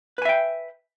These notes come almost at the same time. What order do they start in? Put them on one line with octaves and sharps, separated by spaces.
B4 G#5 E5 G5